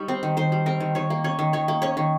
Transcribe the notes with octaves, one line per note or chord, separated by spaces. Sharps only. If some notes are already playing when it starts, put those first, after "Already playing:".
Already playing: G3 D#4 C#5
C4
D#3
D#3 C5
G3
C4 A#4
D#3
D#3 C#5
A#3
C#4 C#5
D#3
D#3 C#5
A#3
C#4 C#5
D#3